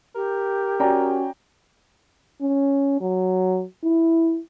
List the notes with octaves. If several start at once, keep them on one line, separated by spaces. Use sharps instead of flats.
G4 A#4
C#4 F#4 D5 G5 A#5
C#4
F#3
E4